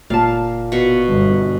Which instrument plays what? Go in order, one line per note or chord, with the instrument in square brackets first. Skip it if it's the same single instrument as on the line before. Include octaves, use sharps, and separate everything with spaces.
[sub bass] F#1 [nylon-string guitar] A#2 A5 [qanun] F5
[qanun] B2 C#6
[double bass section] G1